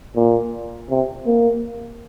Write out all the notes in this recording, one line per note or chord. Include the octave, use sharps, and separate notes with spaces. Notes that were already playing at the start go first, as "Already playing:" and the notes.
A#2
C3
A#3